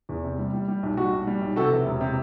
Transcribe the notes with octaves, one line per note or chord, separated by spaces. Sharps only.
E2
C3
G3
G3
G3
B1
G3 F#4
B1
G3
B1
C3 F#4 A4
E3
E1
C3